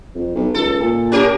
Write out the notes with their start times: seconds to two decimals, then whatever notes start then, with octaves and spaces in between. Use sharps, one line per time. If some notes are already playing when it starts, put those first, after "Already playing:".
0.15 F2
0.35 B1
0.54 C#2 A4
0.80 A#2
1.12 C#4 G4 A#4